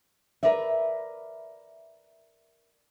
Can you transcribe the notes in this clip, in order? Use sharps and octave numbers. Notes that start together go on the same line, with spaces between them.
A#4 B4 D5 E5